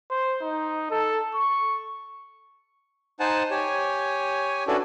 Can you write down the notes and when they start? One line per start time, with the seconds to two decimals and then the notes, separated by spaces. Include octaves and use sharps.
0.10 C5
0.41 D#4
0.91 A4
1.35 C#6
3.20 D#4 C5 F#5 G#5 A5
3.51 G4 C#5 G#5
4.68 C#4 D4 E4 F#4 A4 B4